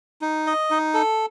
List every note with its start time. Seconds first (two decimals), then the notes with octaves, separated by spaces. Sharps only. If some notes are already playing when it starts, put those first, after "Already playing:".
0.22 D#4
0.47 D#5
0.71 D#4
0.94 A4